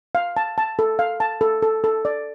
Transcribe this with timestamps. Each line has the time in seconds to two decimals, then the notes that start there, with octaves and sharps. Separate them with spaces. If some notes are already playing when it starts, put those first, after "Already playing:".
0.15 F5
0.37 A5
0.58 A5
0.79 A4
0.99 F5
1.20 A5
1.41 A4
1.62 A4
1.84 A4
2.05 D5